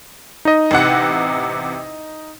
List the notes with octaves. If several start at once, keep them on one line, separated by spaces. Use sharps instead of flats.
D#4 D#5
A1 C3 F#5